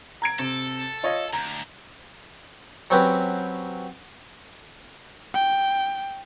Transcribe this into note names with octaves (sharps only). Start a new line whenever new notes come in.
A#5 G#6 D7
C3 A4
F4 C#5 D#5
D2 A#5
F#3 C4 C#4 G4 B4
G5